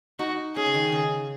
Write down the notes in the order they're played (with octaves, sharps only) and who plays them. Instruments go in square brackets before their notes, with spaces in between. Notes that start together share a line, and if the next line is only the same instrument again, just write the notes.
[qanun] D#4 [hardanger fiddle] F#4
[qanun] C#4 [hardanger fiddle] G#4
[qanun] C#3
D#3
C#3